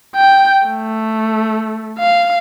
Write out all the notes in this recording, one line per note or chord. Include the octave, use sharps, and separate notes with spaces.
G5
A3
F5